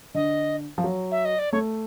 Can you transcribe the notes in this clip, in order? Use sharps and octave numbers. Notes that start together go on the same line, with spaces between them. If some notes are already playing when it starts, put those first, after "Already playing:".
D3 D#5
F3
F#3
E5
D#5
D5
A3 C#5